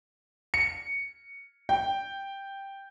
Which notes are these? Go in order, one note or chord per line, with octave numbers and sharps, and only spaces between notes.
C#7
G5